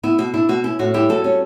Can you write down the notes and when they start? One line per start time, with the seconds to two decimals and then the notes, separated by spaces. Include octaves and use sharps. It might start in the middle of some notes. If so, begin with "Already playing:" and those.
0.03 B3 E4
0.18 B2 F#4
0.34 D4 E4
0.49 B2 F#4
0.64 C#4 E4
0.79 A2 F#4
0.94 G3 E4 G4
1.09 G3 F#4 A4
1.24 C#4